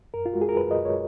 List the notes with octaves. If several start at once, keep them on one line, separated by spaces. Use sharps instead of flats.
F#2 A#4
F4
G#3 F#4
G#4
A#4
F#2 B4
D#5
F#2
C#5